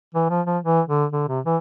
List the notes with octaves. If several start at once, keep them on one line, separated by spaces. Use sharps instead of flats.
E3
F3
F3
E3
D3
D3
C3
E3